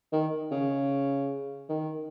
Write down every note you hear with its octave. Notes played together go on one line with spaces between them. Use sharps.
D#3
C#3
D#3